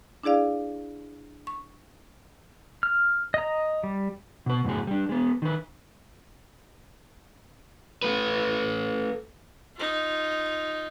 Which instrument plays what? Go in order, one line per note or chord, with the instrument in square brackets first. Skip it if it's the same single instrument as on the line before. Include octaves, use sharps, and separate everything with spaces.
[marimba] D4 E4 G#4 D5 F5
C#6
[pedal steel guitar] F6
D#5 A#5
G3
[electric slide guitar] B2 B4
F#2 A2 C#3 G#4
G3 D4
G#3 B3
D#3 B4
[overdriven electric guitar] A3 B4
[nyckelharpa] D#4 F4